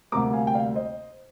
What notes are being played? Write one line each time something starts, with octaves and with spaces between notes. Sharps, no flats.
D2 C3 G3 A#3 A#5 D6
F5 G#5
G5
D5 F5
C5 D#5